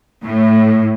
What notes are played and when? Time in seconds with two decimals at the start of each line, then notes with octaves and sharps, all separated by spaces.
0.24 A2